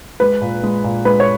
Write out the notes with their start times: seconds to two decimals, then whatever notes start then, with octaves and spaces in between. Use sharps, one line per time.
0.20 G#3 B4
0.41 A#2
0.63 G#3
0.84 A#2
1.05 G#3 B4
1.20 C#5